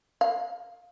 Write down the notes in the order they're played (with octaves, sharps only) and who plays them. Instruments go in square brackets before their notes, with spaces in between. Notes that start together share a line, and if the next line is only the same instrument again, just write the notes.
[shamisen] F5